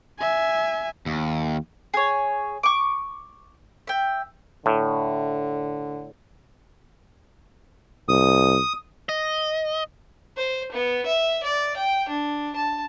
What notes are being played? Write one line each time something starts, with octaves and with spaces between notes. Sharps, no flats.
E5 G#5
D#2
G#4 C#5
C#6 D6
E5 G5
A2 D3
C2 D#6
D#5
C5
B3
E5
D5
G5
D4
A5